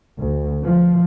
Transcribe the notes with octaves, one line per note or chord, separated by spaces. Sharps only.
D2
F3